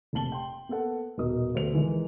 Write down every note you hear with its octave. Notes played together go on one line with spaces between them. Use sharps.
F1 A#2 C4 A5 F#7 G7
G5 C6
A#3 B3 A4 F#5
D#1 B2 A#4 D#5 D#6
D2 B2 B3 C5 E5 F7
D#3 E3 G#3 A#4